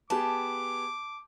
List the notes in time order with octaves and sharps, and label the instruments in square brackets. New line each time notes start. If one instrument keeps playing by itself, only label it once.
[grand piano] B3 G4 G#4 [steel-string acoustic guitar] A5 [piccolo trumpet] D6